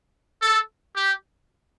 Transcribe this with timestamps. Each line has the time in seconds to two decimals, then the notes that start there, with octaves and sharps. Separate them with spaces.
0.43 A4
0.97 G4